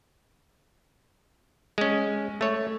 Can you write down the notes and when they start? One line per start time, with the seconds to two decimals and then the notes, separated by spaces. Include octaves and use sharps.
1.78 G#3 C#4
2.41 A3 C#5